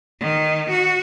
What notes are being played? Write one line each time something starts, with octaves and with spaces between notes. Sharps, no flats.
D#3
F#4